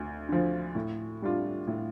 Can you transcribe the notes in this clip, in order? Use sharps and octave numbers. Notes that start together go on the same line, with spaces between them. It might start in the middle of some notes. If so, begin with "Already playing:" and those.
Already playing: D2
D3 F3
A2
G3 D4 F4
A2